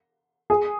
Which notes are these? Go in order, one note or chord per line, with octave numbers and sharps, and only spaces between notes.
G#4